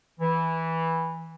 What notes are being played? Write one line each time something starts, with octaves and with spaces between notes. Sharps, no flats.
E3